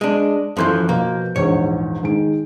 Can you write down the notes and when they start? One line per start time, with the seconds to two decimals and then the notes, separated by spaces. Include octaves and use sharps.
0.01 G#3 D4
0.57 F#2 E3 F3 A4 C6 G6
0.89 B2 F3 A#3 A#5
1.36 A#1 E2 G#2 C#5
2.03 D#3 G#3 D7